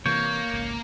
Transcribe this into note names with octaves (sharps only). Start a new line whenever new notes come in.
C3 E3 A#3 C#5 G6
G#1 C#2